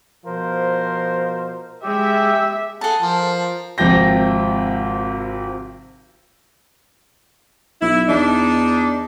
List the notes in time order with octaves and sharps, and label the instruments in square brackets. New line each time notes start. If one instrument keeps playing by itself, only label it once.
[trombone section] B2 F3 A#4 C5
[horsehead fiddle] G#3 [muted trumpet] G4 [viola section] E5
[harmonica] G#4 F#5 [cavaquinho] A4 A5
[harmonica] F3 A#4 C5
[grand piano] G#1 C3 F3 G5 G6 A#6
[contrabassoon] B1 [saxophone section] E4
[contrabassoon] E2 [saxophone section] D4 D#4